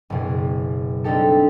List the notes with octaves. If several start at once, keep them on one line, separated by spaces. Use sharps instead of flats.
F#1 B2 G#4
G3 C4 D4 D#4 G4 A4